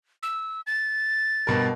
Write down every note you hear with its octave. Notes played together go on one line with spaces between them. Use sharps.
E6
A6
G2 B2 A#4